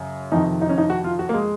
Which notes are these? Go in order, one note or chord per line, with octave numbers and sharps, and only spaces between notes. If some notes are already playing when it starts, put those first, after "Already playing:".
Already playing: F#2 C#3
F2 C3 D#3 D#4
D#4
C#4
D#4
F#4
F4
F#4
A#3
G#3